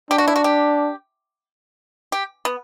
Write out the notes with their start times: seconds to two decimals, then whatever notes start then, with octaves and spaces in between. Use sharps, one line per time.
0.11 D4 G4
0.18 F#4
0.28 E4
0.36 F#4
0.44 G4
2.12 G4
2.45 B3